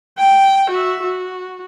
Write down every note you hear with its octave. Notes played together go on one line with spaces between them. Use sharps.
G5
F#4 E5
F#4